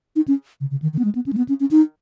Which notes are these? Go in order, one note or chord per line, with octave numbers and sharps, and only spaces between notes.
D#4
C#4
C#3
C#3
D#3
D#3
B3
G#3
B3
C#4
G#3
B3
C#4
C#4
D#4